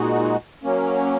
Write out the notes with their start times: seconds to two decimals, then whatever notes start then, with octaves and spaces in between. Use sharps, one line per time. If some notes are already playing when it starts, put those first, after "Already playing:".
Already playing: A#2 G#3 D#4 F#4
0.63 F#3 A#3 C#4